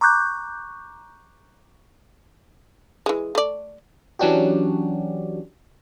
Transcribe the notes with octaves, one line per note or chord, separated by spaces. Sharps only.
A#5 C#6 D6 F#6 G6
E3 G#3
A3 D5
E3 F#3 C#4 D4 F#4 G4